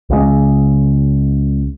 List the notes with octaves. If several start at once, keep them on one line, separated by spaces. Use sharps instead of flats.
C#2 C#3 G#3